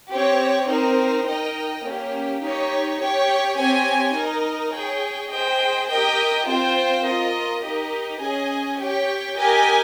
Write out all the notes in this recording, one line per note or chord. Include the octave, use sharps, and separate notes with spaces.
C4 G4 C#5
C4 D#4 A#4
D#4 A#4 D#5 G5
A#3 C#4 G4
D#4 G4 C#5
G4 C#5 G5
C4 G4 C#5 G#5
D#4 A#4 D#5
G#4 C#5 G5
G#4 C5 D#5 G5
G4 A#4 D#5 G5
C4 F4 C5 G5
F4 A#4 D#5
D#4 G4 A#4 D#5
C#4 G#4 D#5 G#5
G4 C#5 G5
G4 A#4 D#5 G#5